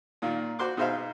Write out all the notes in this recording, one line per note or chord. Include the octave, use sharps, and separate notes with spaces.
A#2 D#3 F4
F#4 C5 C6 D6
B2 D#4 G#4 C5 E5 F5